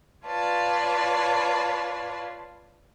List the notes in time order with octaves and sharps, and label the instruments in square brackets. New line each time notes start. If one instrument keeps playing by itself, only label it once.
[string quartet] F4 B4 C#5 D5 A5